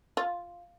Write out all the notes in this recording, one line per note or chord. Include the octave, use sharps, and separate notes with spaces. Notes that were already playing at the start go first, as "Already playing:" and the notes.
F4